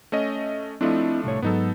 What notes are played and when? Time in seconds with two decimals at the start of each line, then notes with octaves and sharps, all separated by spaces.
0.12 A3 C#4 D#5
0.81 F3 A3 C4 D4 E4 D#5
1.24 C2 A2 C#5
1.42 G#2 F#3 B3 D#4 A4